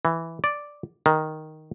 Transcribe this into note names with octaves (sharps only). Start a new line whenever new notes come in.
E3
D5
D#3